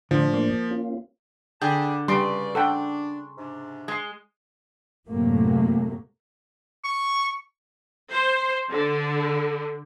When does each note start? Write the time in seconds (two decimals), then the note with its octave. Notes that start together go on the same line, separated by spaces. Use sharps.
0.11 A2 D3 F3 D4
0.34 A#3
0.71 C#4 F4
1.62 D3 G#4 D5 G5 A5 B5 G6
2.08 C#3 G3 F4 B4 D5 C6 C7 D7
2.55 D4 A4 F#5 G5
3.37 G#2 C3 D4
3.88 G#3 G#6 C7
5.08 F#2 A2 C3 F#3 A3 A#3
6.84 C#6
8.11 C5
8.70 D3